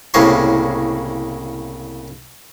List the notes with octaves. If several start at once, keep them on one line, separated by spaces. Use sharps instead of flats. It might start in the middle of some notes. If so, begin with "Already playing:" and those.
C2 A2 C#3 A#3 C#5 C6